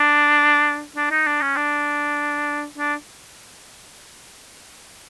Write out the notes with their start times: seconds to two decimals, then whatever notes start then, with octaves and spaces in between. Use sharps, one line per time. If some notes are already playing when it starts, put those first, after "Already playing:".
Already playing: D4
0.96 D4
1.11 D#4
1.26 D4
1.42 C#4
1.56 D4
2.78 D4